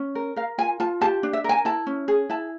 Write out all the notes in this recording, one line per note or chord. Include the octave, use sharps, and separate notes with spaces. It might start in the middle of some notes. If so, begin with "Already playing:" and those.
Already playing: C#4
A#4
A#4 F5
F4 G#5
F4 A5
G4 A5
D4
E5
A#4 G#5
E4 A5
C#4
G#4
E4 A5